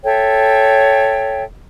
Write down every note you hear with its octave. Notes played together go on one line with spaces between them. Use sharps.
A4 C#5 E5 G5